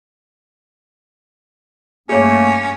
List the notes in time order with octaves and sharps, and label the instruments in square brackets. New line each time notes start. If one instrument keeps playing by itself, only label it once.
[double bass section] G2 [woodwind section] A3 A#3 [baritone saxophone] C#4 [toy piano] G#4 C#5